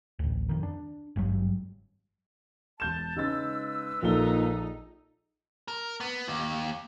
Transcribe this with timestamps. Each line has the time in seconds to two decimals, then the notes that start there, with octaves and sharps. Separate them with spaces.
0.19 A1 D2
0.49 F2 D#3
0.63 D4
1.16 G#1 G2 C3 F#3
2.80 E1 A5 G6 E7
3.16 C#3 G#3 D#4 B4 E6 A6
4.02 A#1 A#2 D#4 A4 G7
5.68 A#4
6.00 B3
6.28 D#2